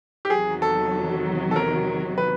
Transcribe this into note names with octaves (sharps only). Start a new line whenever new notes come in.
G4
E2 C3 D#3 F#3 G#4
A4
A4
A#4
B4